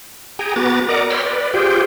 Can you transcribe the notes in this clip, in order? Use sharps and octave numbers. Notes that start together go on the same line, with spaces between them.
G#4 G5 G#5 A#5
B3 F#4 B4 A#5 D6 A6
A#4 D5 D#5 F#5 A#5 D6
C#5 G5 B5 C6 E6 F6
B4 D5
F4 G4 G#4 C5 G5